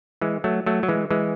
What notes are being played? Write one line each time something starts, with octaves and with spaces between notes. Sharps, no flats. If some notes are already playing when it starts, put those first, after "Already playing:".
E3 G#3
F#3 A3
F#3 A3
F#3
E3 G#3
E3 G#3